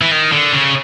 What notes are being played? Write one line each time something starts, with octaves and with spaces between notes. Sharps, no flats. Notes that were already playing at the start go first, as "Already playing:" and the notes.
E3
D#3
D3
C#3